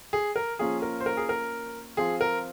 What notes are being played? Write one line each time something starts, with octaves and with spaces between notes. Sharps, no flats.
G#4
A#4
F3 A#3 C#4 F4 G#4
A#4
C5
A#4
G#4
A#4
F3 C4 F4 G#4
A#4